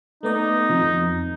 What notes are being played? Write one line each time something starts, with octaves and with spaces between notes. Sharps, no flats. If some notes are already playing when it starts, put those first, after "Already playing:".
A3 B3 D#4 D5
F2